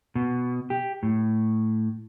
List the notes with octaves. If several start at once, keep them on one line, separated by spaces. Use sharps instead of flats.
B2
G4
A2